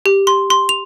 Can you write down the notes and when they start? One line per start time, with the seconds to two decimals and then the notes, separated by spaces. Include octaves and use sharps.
0.06 G4
0.27 C6
0.50 C6
0.69 F7